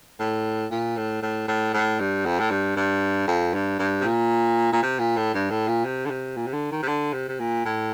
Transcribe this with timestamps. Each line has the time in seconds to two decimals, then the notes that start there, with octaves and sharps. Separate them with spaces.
0.20 A2
0.71 A#2
0.97 A2
1.22 A2
1.48 A2
1.73 A2
2.00 G2
2.25 F2
2.40 A2
2.50 G2
2.76 G2
3.27 F2
3.54 G2
3.79 G2
4.01 C3
4.04 A#2
4.72 A#2
4.83 C3
4.99 A#2
5.16 A2
5.34 G2
5.50 A2
5.68 A#2
5.85 C3
6.06 D3
6.10 C3
6.36 A#2
6.47 C3
6.53 D3
6.71 D#3
6.83 C3
6.88 D3
7.13 C3
7.28 C3
7.40 A#2
7.65 A2